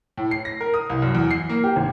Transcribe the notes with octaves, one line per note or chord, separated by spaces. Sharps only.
A2
C7
A#6
A#4
D#6
C2
F#2
E2
C7
A#3
G4
G#1